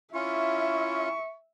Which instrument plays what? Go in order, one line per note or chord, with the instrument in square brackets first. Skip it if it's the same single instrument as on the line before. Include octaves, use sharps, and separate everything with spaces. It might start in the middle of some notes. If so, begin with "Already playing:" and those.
[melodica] C#4 F4 [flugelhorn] E4 [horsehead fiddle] E5 [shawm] C#6